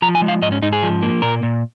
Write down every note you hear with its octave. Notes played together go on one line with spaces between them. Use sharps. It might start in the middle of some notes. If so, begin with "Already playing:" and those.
F3 A#5
G#5
G#3
F5
G#2 D#5
C#4
G#2 D#4
G#4
F3
A#3
A#2 A#4
A#2